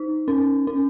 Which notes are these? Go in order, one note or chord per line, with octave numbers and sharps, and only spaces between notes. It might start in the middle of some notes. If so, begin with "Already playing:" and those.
Already playing: D#4
C#4
C#4